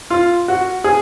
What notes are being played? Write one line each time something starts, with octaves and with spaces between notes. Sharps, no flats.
F4
F#4
G#4